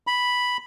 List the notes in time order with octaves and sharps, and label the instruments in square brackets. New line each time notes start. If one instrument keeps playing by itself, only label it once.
[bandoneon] B5